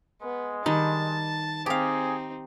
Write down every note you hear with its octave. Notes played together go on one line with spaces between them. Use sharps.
G#3 B3
D#3 G3 D#4 A5
C4 D#4 G4 G#4 F5